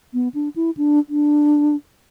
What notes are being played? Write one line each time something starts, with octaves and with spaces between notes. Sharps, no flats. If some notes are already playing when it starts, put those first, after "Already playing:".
B3
D4
E4
D4
D4